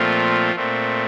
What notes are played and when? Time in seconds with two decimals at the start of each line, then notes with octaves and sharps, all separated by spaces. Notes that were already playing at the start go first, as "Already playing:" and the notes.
Already playing: A#2 F3 A3 C4 F4
0.55 A#2 A3 C4